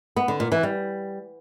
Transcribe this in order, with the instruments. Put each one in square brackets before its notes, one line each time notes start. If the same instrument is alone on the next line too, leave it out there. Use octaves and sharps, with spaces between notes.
[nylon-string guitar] B3
D3
A#2
E3
G3